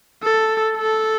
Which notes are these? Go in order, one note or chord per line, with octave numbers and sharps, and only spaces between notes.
A4
A4